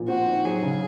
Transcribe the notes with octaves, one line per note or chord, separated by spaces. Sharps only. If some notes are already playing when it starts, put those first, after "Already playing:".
Already playing: A#2 F3
C4 F#4
D#4
F#3 G#4
C#3